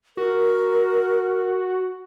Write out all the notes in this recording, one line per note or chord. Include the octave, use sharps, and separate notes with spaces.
F#4 A#4